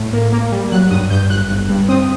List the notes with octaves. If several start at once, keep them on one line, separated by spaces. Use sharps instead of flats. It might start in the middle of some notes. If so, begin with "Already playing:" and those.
Already playing: A2
A#3
A#3
G3
F#3 F#6
G2 D#6
G2 G6
G1 F#6
G1
G2
C4 D#6